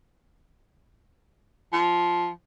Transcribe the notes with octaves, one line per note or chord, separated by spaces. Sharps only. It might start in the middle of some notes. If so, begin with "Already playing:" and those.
F3